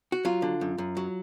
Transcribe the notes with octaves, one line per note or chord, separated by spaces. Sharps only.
F#4
F#3 F4
D3
F#2
F#2
F#3